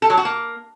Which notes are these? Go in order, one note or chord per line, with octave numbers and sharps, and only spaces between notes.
A4
F#3
F#4
A#3